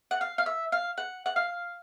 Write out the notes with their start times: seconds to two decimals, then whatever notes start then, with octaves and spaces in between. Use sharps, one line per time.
0.11 F#5
0.21 F5
0.38 F5
0.46 E5
0.72 F5
0.98 F#5
1.26 F#5
1.36 F5